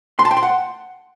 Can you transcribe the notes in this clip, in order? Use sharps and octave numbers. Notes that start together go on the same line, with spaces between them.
C6
A5
G5
C6
F#5